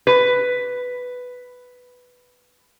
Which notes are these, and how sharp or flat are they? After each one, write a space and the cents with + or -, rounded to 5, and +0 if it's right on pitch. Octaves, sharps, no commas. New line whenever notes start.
B4 +5